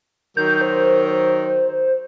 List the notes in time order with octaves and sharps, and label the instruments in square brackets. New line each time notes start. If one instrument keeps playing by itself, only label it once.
[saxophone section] D#3 F#3 A#4 [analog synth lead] G6
[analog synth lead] C5